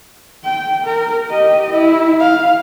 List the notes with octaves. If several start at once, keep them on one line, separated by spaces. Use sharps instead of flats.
G5
A#4
G4 D#5
E4
F5